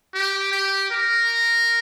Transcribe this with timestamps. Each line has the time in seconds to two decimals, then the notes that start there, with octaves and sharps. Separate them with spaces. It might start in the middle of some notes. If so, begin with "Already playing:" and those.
0.14 G4
0.51 G4
0.91 A#4